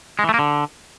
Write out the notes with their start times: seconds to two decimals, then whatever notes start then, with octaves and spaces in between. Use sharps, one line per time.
0.19 G#3
0.24 E3
0.29 A3
0.34 A#3
0.39 D3